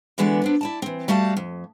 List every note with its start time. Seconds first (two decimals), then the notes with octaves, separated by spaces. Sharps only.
0.18 D3 E3 G#3 B3 F#4 D5
0.42 B3 C4 D4
0.61 E4 D5 A5
0.82 E3 C4
1.08 G3 A3 F#4 F5 A5
1.37 F2